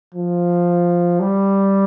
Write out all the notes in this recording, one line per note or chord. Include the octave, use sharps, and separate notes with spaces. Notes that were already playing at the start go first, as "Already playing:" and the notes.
F3
G3